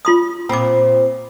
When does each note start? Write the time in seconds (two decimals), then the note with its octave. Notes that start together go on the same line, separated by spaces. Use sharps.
0.05 F4 C6 D#6
0.49 A#2 C4 B5 D6